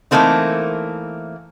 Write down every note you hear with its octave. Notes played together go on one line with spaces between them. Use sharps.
E3 F3 A3 A#3 C4 D#4